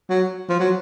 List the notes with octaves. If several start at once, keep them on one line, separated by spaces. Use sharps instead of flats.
F#3
F3
F#3